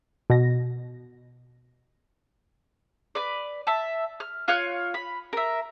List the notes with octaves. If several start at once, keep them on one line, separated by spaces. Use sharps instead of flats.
B2 A#6
B4 D5
E5 A5
F6
F4 C#5 F5 F#6
B5
A#4 E5